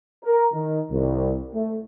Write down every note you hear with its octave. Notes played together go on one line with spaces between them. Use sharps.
A#4
D#3
C2
A3